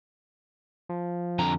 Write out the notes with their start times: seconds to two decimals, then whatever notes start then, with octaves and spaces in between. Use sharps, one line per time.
0.89 F3
1.39 F2 D3 A#5